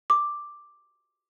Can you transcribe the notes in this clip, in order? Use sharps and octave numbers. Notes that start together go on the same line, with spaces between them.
D6